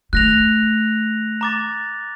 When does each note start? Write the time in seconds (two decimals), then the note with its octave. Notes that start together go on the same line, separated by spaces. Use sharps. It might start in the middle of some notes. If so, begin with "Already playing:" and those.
0.13 D#3 A3 F#6 A#6 F7
1.41 A#5 D6 A6